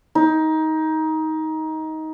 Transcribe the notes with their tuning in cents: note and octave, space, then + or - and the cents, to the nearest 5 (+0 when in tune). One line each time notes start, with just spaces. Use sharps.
D#4 +20